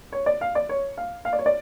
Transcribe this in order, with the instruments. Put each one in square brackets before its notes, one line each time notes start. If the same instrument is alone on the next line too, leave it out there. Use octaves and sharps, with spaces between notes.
[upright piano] C#5
D5
F5
D5
C#5
F5
F5
D5
C#5
D5